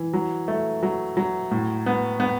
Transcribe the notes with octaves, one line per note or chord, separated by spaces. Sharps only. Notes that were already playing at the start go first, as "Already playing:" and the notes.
Already playing: E3
F#3
A3
F#3
F#3
A2
B3
B3